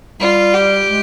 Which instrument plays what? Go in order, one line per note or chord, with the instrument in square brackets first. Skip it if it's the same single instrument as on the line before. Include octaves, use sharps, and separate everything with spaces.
[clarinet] G3 [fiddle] F4
[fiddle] G4
[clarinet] G#3